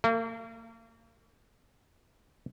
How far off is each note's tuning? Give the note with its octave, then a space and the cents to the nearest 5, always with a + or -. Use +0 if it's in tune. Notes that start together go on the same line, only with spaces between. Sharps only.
A#3 -40